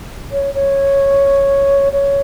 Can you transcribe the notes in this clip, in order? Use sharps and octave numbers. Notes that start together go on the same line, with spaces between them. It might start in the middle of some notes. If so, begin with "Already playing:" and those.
C#5
C#5
C#5